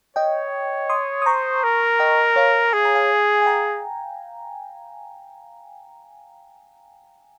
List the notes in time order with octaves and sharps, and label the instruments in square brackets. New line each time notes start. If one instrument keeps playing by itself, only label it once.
[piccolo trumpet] C#5 [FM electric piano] D#5 G5
[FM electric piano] C6 D#6
D#6
[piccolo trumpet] C5 [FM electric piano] A#5 C#6
[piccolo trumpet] A#4
[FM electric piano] D#5 G5
C#5 F5
[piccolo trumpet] G#4 [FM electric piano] G#5
[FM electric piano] A#5
F5 G#5
G#5
G5 A#5